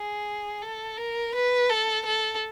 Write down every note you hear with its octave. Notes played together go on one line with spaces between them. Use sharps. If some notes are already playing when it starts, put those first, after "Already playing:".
Already playing: G#4
A4
A#4
B4
A4
A4